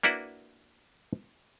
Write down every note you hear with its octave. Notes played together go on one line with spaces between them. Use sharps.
A#3 D4 E4 F#4 B4